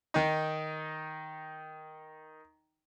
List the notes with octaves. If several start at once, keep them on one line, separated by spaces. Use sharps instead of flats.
D#3 D#4